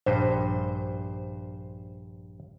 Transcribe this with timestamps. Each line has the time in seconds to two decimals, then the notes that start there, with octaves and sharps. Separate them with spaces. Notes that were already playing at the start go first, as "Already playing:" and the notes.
0.06 A#1 G2 C5